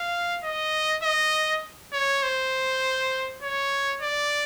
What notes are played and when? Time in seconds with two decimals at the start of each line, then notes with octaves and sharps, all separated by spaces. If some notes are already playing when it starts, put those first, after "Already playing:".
Already playing: F5
0.44 D#5
1.03 D#5
1.93 C#5
2.23 C5
3.43 C#5
4.02 D5